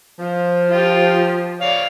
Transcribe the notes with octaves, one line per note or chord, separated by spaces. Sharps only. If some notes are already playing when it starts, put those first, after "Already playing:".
F3
F4 G4
C#5 D5 F5